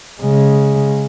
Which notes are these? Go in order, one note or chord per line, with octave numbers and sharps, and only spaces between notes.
C#3 G#3